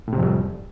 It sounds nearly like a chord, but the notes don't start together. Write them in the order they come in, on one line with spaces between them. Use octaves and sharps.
A2 C3 F2 G3